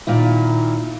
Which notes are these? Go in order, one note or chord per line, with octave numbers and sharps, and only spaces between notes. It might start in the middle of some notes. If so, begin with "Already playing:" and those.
A#2 D#3 E4